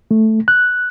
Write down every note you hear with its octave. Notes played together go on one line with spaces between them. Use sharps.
A3
F#6